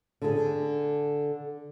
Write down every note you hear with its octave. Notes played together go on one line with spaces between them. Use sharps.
D3 G#4